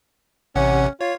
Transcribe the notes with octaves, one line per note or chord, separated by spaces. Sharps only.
A1 C3 C#4 F#5
F4 C#5